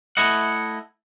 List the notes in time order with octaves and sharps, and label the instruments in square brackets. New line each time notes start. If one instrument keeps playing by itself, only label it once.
[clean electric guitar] A3 E4 D#5 F#5